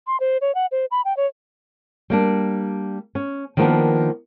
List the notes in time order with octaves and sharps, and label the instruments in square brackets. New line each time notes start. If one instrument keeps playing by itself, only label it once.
[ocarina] C6
C5
C#5
F#5
C5
B5
G5
C#5
[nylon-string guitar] G3 A#3 D4
C#4
D#3 F3 G3 A#3 B3 D4